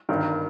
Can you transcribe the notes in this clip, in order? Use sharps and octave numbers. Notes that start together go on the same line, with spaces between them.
G1 G2 D#3 A#4